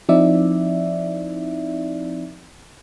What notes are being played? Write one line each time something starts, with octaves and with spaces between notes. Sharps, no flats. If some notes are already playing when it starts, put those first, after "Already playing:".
F3 C4 D#4 E4 D5 E5